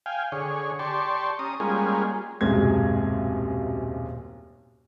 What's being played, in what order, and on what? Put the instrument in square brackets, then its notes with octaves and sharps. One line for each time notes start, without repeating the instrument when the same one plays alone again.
[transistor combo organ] F5 G5 G#5
D3 G#4 C#5
G4 D5 A5 C6 C#6
C#4 A#5 D#6
G3 G#3 A#3 C#4 F4 G#4
[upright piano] D#1 B1 F#2 C3 G#3 G#6